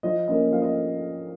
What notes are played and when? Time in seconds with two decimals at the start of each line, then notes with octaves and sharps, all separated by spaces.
0.03 F3 D#5
0.28 A#3 C#4 D#5
0.52 F3 F5
0.62 D#5